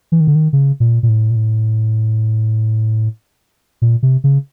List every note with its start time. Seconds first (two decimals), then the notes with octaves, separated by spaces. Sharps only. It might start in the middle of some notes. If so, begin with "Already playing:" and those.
0.12 E3
0.20 D#3
0.27 D3
0.35 D#3
0.53 C#3
0.80 A#2
1.03 A#2
1.09 A2
1.30 A#2
1.36 A2
3.82 A#2
4.03 C3
4.24 C#3